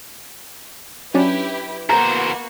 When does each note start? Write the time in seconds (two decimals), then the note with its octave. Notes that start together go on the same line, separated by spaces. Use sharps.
1.14 F#3 C#4 D4 E4 G4 B4
1.89 E2 A#3 B3 F#4 C5 A#5